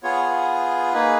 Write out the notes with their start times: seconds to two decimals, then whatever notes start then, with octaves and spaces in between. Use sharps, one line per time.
0.03 B3 F4 G#4 C#5
0.93 A#3 D#4 G#4 B4